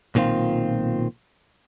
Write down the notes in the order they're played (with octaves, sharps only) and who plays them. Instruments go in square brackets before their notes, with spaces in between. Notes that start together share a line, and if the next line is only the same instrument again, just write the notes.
[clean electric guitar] B1 A#2 D#3 C4 F4